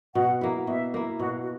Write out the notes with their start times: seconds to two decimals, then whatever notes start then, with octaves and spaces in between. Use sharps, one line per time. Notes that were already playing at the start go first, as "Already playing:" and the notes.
0.15 B2 F#5
0.41 A#3 E4
0.67 B2 E5
0.94 A#3 E4
1.19 B2 F#4
1.42 F#4